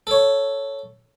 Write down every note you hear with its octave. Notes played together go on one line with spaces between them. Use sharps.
A4 C#5